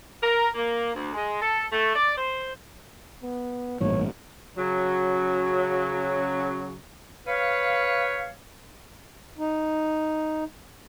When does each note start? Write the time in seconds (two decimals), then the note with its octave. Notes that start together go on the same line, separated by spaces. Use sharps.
0.23 A#4
0.55 A#3
0.94 D2
1.14 G#3
1.41 A4
1.72 A3
1.96 D5
2.17 C5
3.23 B3
3.81 A1 G2 A#2 C#5
4.57 C#3 F#3
7.27 B4 C#5 F5
9.38 D#4